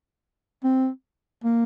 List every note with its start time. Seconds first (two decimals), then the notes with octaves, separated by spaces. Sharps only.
0.64 C4
1.44 A#3